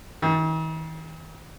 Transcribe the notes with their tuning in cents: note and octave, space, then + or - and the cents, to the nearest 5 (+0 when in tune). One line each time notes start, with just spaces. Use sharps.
D#3 +45